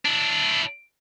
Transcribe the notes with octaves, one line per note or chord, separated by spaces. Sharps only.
D4 E4